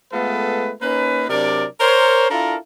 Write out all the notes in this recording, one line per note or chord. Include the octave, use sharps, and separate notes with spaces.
G#3 A3 B3 F4 A4 B4
A#3 C#4 D#4 B4
C3 F#3 D4 A#4 D5
A#4 C5 C#5
D4 E4 F4 A4 A#4